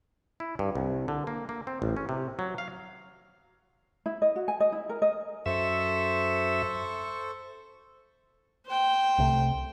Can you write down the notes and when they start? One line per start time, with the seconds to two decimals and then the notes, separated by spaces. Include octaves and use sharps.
0.40 E4
0.59 G2
0.75 C2
1.08 D3
1.27 A#3
1.49 A#3
1.67 C4
1.82 A1
1.97 C#4
2.09 C3
2.39 F#3
2.58 F5
4.06 E4
4.22 D#5
4.36 F#4
4.48 G#5
4.60 D#5
4.72 E4
4.89 A#4
5.02 D#5
5.46 F#2 A4 C5 E5 C#6
8.66 C5 G5
9.18 C2 C3 A3